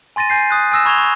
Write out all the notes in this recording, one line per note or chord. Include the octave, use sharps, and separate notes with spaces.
G#5 C6 A6 A#6 D#7
G#5 G6 C7
D#6 F#6
G#5 D#6 E6 A#6 E7
B5 C#6 G#6 E7 F7 G7
C#6